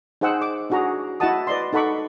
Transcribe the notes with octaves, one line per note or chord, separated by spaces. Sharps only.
D#4 G#4 C5 F#5 G5 E6
D6
D4 E4 F#4 G#4 A#5
E4 F#4 D#5 F#5 A5 D#6
B4 D5 D#5 C6
D#4 A4 F#5 B5 C#6 D6